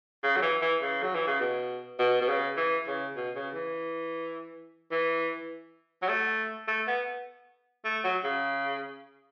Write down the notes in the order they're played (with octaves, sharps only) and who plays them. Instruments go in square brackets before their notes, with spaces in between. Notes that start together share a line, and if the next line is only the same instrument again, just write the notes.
[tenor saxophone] C#3
F#3
E3
E3
C#3
F#3
E3
C#3
B2
B2
B2
C#3
E3
C#3
B2
C#3
E3
E3
F#3
A3
A3
B3
A3
F#3
C#3